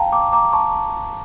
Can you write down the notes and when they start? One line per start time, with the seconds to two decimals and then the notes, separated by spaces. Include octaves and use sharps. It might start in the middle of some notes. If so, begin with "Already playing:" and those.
Already playing: F5 G5 A5 A#5
0.12 A#5 D6
0.33 A#5 D6
0.53 A5 C#6